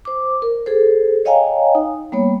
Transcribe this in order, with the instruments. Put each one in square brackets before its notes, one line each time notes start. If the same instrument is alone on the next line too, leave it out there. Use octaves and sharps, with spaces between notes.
[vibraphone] C5 D6
A#4
G#4 A4 C5
C#5 D#5 F5 G5 G#5 A#5
D#4
G3 A#3 B3 C#5